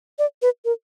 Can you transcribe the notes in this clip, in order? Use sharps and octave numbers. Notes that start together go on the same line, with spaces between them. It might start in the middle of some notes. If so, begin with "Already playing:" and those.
D5
B4
A#4